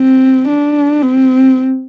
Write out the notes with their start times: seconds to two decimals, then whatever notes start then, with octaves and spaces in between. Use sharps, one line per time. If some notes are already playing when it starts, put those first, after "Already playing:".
Already playing: C4
0.48 D4
1.02 C4